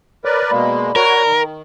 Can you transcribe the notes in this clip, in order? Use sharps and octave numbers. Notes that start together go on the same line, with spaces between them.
A#4 B4 C#5 D5
B2 G#3 A#3 D5 B5
F#4 A#4 C#5
D#3